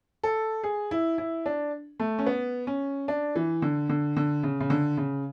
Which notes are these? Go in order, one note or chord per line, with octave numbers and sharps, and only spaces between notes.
A4
G#4
E4
E4
D4
A3
C#4
B3
C#4
D4
E3
D3
D3
D3
C#3
C#3
D3
C#3